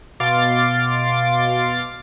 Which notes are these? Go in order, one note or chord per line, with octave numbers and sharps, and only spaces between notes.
B2 F5 C6 D6 A6 D7